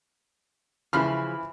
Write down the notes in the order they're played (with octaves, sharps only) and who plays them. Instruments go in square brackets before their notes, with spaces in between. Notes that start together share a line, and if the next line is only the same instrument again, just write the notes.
[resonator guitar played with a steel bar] C#3 F3 [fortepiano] E3 B5 F6